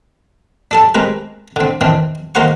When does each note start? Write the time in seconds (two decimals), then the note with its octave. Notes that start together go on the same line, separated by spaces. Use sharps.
0.71 D4 A4 A5
0.95 G#3 C4 A#4 B4
1.56 D3 C4
1.81 D#3 E3 C4 D4
2.35 D#3 A#3 A#4 C5 F#5 C#6